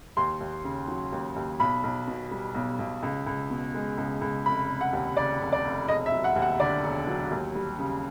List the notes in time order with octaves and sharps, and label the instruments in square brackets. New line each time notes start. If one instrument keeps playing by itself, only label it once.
[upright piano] D#2 C6
D#2
C#3
F#3
D#2
D#2
B1 B5
B1
B2
G3
B1
B1
C#2
C#2
B2
G#3
C#2
C#2
F1 B5
F1
F#5
D#2
C#3 D5
F1
D5
F1
E1 D#5
E5
F#3
F#5
D#2
F#5
D3 D5
E1
F#3
D#2
G3
C#3